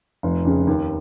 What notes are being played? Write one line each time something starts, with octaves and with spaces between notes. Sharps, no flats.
F1
F2 C#3
D#2